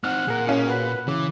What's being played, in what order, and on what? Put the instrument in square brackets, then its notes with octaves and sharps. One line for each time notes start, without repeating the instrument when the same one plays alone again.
[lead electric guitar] C4 D#4 [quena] F#5 [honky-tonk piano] F6
[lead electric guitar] A#2 [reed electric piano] G#4 A#4
[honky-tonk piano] B2 C#4
[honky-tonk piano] F#4 [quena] B4
[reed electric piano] C#3 [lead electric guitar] E3 [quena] D6